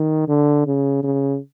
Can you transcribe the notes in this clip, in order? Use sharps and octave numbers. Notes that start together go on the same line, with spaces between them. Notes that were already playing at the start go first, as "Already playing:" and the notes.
Already playing: D#3
D3
C#3
C#3